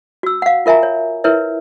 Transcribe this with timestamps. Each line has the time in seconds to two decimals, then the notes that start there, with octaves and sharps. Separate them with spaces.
0.23 F#4 E6
0.42 F5 F#5
0.66 F4 A#4 E5 G#5 A#5
0.83 C#5
1.24 E4 A#4 B4 C#5 E5